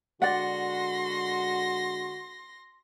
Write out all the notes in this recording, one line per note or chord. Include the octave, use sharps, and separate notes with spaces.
D3 G#3 F#4 D5 F#5 C6 A#6